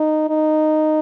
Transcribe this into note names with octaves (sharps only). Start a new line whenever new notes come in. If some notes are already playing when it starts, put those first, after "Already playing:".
Already playing: D#4
D#4